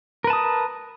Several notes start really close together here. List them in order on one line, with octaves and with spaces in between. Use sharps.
A#4 B4 A5 D#6